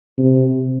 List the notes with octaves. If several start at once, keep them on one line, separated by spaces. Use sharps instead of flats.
C3